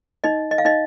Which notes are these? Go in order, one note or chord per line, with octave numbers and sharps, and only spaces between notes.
D#4 D#5
D#5
F5
D#4 D#5